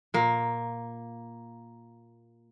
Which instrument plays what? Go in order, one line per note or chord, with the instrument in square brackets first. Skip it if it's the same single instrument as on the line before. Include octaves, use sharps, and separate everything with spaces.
[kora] A#2 A#3